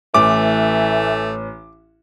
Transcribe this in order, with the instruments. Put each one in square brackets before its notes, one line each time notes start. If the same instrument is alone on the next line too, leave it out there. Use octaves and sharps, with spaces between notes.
[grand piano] A1 [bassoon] E3 [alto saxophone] A3 [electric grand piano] D6